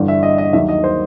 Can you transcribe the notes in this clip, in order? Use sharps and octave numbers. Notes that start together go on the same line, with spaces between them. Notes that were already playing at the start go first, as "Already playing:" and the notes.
Already playing: G1 G2 E3 G3
E5
D#5
D#5
D#2 D#3 F#3 E5
D#5
C5